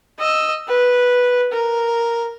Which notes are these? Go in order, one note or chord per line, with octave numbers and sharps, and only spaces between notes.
D#5 E6
B4
A#4